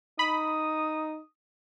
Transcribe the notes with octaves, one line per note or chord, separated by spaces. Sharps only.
D#4 B5 D#6